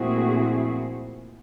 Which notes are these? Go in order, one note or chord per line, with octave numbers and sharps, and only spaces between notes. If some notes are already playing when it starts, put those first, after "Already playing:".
Already playing: A#2 F3 A3 C4 E4 F#4 G#4